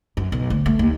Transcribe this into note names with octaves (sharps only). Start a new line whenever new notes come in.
F#2
B1
D2
A3
D#2